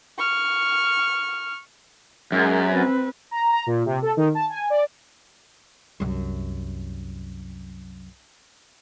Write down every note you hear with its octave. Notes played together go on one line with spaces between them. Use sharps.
C#6 F6
F#2 G#3 A#4
C4 B4
A#5
A#5
A#2
C3
A4
D#3
A5
G#5
D5
C2 F#2